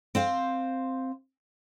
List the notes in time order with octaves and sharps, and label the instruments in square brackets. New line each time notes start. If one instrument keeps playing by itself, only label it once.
[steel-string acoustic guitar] C4 C5 F5